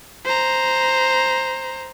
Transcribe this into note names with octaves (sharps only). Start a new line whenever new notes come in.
C5 A#5